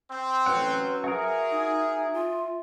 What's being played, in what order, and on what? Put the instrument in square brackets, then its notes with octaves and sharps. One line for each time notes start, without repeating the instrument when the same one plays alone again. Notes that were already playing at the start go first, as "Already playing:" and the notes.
[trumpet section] C4
[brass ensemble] A1 [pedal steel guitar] F#3 C#4 F#5 [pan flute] B4
[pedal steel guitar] F#4 A#4 [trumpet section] G#4 [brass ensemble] E5
[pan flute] D#4
F4